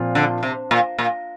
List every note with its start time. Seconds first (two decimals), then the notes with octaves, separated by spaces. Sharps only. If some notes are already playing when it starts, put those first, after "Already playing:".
Already playing: A#2 F3 C4 F4
0.15 D3
0.43 C3
0.71 A#2
0.99 A#2